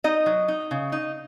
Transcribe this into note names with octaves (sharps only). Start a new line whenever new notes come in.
D#4 D#5
F#3
D#4
C#3
D#4